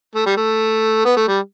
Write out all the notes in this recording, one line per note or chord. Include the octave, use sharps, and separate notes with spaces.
A3
G3
A3
B3
A3
G3